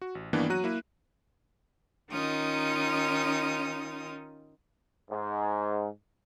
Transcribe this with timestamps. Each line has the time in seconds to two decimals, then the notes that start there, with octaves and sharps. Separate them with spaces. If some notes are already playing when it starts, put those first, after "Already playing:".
0.02 F#4
0.15 A1
0.33 G2 D#3 E3 A#3 B3 D4
0.50 F#3 F#4 A#5 F#6 D#7
0.64 A#3 E4
2.11 D#3 C#4 D#4 F4 D#6
5.11 G#2